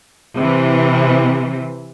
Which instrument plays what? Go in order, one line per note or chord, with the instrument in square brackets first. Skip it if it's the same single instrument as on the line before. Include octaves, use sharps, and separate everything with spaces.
[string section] C3 E3